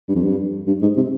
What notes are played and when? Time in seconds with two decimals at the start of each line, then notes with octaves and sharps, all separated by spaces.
0.09 G2
0.16 F2
0.23 G2
0.68 G2
0.82 G#2
0.97 C3